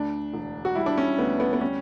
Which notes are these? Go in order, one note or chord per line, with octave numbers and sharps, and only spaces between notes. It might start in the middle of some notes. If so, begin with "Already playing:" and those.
Already playing: D2 D4
E1
F#4
G3 E4
D4
C#4
D2 B3
B3
B3
G3 C#4